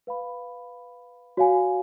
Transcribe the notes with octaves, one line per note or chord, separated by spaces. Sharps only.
B4 F5 B5
F#4 C#5 F5 G#5